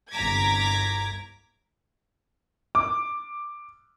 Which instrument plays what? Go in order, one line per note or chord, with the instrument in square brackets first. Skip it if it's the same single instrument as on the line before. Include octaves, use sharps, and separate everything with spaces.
[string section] G1 C2 A#5 D6 G#6 B6
[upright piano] D6